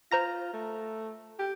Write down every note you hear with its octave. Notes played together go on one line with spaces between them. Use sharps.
F4 C5 A#5 A#6
A3
G4